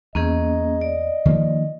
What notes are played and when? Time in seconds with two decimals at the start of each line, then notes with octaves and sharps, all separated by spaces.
0.15 E2 A#3 C#4 G#4 D#5
0.81 D5
1.25 D#3 F3 A#3